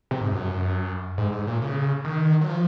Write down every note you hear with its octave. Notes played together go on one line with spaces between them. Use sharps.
C3
G#2
F#2
G#2
G#2
A#2
C#3
D#3
F#3
F3